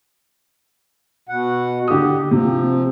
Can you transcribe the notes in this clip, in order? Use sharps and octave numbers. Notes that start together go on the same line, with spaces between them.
B2 F#5
D3 G4 D#6
C3 F3